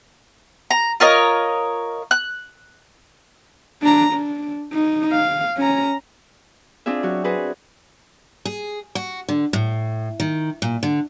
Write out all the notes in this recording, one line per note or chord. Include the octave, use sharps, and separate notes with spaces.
A#5
F4 A#4 C#5 D#5
F#6
D4 A#5
D4
D#4
F5
C#4 A#5
C4 D4 F4 G#4 E5
F#3 F#4
F#4 G#4 B4 C5
G#4
F#4
D3
A2
D#3
A#2
D3